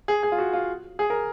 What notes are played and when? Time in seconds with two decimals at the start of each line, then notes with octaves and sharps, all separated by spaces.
0.08 G#4
0.23 G#4
0.32 F4
0.38 F#4
0.53 F4
0.99 G#4
1.10 A#4